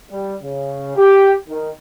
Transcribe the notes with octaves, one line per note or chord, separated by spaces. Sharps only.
G3
C#3
G4
D#3